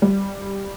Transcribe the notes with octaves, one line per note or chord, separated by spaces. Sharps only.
G3